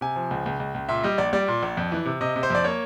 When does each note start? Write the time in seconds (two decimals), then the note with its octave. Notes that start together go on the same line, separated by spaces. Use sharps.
0.01 C3 G#5
0.16 F3
0.31 C#2
0.46 C#2
0.60 C#2
0.74 C#2
0.89 A#2 E5
1.03 G3 D#5
1.18 A#1 D5
1.33 G3 D5
1.48 A#2
1.63 A#1
1.77 F2
1.92 E3
2.05 C3
2.21 C3 D#5
2.36 C3
2.43 C5
2.50 F2 D5
2.64 A#3 C#5